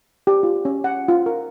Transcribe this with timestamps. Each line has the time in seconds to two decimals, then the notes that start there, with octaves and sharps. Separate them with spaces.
0.27 G4
0.43 F4
0.65 C#4
0.84 F#5
1.08 F4
1.26 A#4